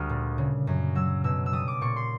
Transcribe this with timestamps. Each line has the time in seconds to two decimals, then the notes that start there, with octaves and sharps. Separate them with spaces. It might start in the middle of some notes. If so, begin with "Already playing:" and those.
Already playing: D2 G3 D#6 F6
0.09 A#2
0.38 C#3
0.67 F#2
0.95 F#3 E6
1.24 B2 E6
1.46 E6
1.53 G3 D#6
1.68 D6
1.81 A#2 C#6
1.96 C6